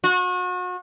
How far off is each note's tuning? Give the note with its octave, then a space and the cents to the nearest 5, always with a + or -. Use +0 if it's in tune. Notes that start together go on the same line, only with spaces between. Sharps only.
F#4 -35